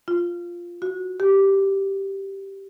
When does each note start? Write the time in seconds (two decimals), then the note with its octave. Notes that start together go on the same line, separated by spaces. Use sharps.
0.08 F4
0.82 F#4
1.20 G4